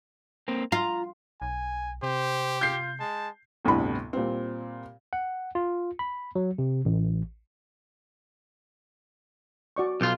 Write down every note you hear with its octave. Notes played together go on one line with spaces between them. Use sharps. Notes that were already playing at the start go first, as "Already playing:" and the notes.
A#3 C4
F4 A#5
B1 G#5
C3 G4 C5
F4 G6 C7
G#3 A5
G1 D2 A2 C3 B5
A#2 G3 C4
F#5
F4
B5
F#3
C3
A1
F#4 D5 C#6
B1 F4